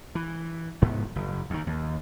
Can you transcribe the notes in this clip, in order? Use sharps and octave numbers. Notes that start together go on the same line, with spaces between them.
E3
F1 G#2 B3
F#1
D#2 D#3
D#2